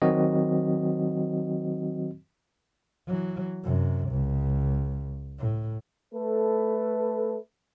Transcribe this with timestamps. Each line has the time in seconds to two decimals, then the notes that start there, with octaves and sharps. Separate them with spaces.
0.02 D#3 F#3 C4 F#4 D#5
3.07 E3 F#3
3.64 F#2 C3
4.09 C#2
5.39 A2
6.13 A3 A4 B4